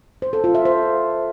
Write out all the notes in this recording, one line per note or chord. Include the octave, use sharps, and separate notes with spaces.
C5
A4
F4
E5
C5